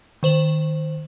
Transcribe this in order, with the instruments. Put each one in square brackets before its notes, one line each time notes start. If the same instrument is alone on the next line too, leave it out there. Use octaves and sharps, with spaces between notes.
[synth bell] D#3 C5 F#7